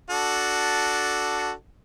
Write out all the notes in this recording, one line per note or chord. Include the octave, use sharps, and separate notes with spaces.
D4 F#4 A4